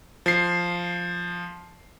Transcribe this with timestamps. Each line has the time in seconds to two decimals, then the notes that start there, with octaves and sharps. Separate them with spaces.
0.26 F3 C7